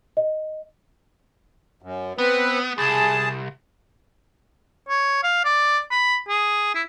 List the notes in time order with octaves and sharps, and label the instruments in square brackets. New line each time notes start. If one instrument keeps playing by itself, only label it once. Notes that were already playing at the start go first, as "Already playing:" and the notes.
[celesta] D#5
[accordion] F#2
[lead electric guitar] B3 [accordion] C4 B4
[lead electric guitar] C2 [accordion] G#4 A5
[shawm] C#5
F5
D5
B5
G#4
E4